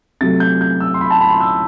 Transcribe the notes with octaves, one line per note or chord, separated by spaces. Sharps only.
C3 F#3 A3 A6
G6
G6
E6
C6
B5
A5
B5
C6
E6